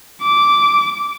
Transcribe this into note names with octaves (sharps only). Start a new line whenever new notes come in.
D6